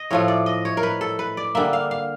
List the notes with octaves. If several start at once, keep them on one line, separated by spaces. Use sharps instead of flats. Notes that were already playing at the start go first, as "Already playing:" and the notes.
Already playing: D#5
A2 F3 A3 C#5
D5
D#5
C#5
A#4
B4
A4
B4
D5
D3 G3 A#3 E5
F5
F5